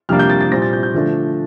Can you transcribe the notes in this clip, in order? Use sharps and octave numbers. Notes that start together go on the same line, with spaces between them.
F2 C3 G3 A#3 D4 F6
G6
A6
A6
A#2 G3 C4 A#6
A6
G6
G6
D3 F3 A3 D4